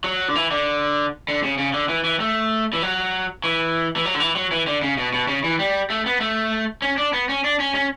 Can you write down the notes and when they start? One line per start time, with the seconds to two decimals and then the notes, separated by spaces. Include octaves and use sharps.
0.04 F#3
0.28 D3
0.35 E3
0.51 D3
1.28 D3
1.44 C#3
1.58 C#3
1.74 D3
1.89 E3
2.04 E3
2.20 A3
2.73 E3
2.82 F#3
3.44 E3
3.96 E3
4.05 F#3
4.15 D3
4.20 E3
4.36 F#3
4.51 E3
4.67 D3
4.83 C#3
4.98 B2
5.14 B2
5.28 C#3
5.44 E3
5.59 G3
5.90 A3
6.06 B3
6.20 A3
6.82 C#4
6.98 D4
7.13 B3
7.29 C#4
7.44 D4
7.60 C#4
7.75 C#4